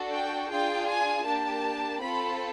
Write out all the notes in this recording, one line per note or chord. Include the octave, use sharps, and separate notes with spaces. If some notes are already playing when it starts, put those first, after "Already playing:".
Already playing: D4 F#4 A4
G5
D4 F4 G#4 G5
G#5
A#3 D4 G4 A5
C4 F4 A4 B5